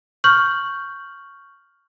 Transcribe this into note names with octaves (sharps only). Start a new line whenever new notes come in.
C#6 F6 G6 F#7